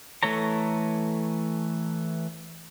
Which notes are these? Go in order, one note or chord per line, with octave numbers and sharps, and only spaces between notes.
E3 A3 A4 C#5 A#5